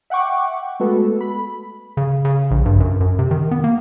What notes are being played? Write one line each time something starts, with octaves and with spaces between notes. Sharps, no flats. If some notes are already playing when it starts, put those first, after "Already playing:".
E5 F#5 G5 C#6 D6
G#3 A3 B3 F#4 A4 B4
B5
C#3
C#3
A#1
G2
F#2
F#2
C3
D#3
B3
A#3